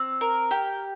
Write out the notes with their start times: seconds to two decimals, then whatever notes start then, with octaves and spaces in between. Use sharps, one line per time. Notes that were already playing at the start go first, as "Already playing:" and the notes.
Already playing: C4
0.21 A#4
0.51 G4